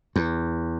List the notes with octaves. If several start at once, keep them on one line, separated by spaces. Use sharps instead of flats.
E2